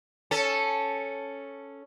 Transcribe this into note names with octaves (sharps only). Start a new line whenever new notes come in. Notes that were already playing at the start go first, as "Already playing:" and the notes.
C#4 A4